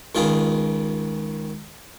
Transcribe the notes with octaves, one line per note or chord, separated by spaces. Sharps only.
C#2 D#3 F4 G#4